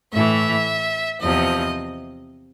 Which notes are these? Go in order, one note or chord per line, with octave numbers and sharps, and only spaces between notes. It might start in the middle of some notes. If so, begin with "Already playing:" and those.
A2 E3 E5
E2 C3 F3 D#5